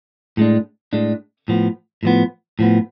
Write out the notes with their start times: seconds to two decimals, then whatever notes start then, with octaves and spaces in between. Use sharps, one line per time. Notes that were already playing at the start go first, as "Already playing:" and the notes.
0.37 A2 G#3 D4
0.93 A2 G#3 D4
1.48 A2 F3 B3
2.03 A2 F3 B3
2.59 A2 F3 B3